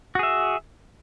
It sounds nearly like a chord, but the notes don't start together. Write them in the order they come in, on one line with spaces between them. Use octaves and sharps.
F#4 G#4 E5